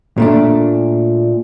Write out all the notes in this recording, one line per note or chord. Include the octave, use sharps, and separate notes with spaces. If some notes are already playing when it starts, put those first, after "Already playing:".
A#2 A3 D4